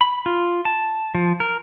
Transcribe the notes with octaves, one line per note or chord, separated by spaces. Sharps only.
B5
F4
A5
F3
A#4